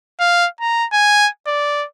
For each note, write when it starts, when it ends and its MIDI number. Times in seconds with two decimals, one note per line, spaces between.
0.20 0.47 77
0.61 0.86 82
0.93 1.28 80
1.47 1.86 74